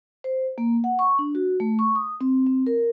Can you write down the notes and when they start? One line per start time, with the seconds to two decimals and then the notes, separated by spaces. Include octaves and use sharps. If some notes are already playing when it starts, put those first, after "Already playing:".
0.24 C5
0.58 A#3
0.84 F#5
0.99 C#6
1.19 D4
1.35 F#4
1.60 A3
1.79 C#6
1.95 D#6
2.21 C4
2.46 C4
2.67 A#4